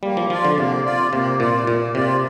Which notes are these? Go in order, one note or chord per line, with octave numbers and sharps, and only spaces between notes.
G3 A#3
F3
F3 F4 D5
D3
C3 A#3
F4 D5
C3 A#3
A#2 F4 D5
A#2 A#3
C3 F4 D5